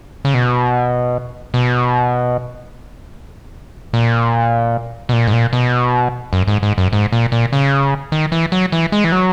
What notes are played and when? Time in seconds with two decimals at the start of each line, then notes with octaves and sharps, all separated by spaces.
0.25 C#3
0.34 B2
1.54 B2
3.93 A#2
5.09 B2
5.13 A#2
5.27 G#2
5.33 A#2
5.53 B2
6.33 F#2
6.48 G#2
6.63 G#2
6.78 F#2
6.93 G#2
7.12 A#2
7.32 A#2
7.53 C#3
8.12 D#3
8.32 E3
8.52 F#3
8.72 E3
8.92 G#3
9.04 E3
9.12 F#3